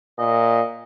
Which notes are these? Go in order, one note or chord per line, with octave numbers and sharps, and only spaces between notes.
A#2 D#5